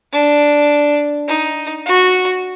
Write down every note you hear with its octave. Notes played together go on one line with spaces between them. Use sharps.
D4
D#4
F#4